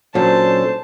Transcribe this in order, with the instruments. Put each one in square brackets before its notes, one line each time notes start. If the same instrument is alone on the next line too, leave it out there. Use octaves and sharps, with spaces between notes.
[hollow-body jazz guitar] A#2 F#3 [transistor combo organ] C#4 D4 A4 [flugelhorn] C5 [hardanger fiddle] A5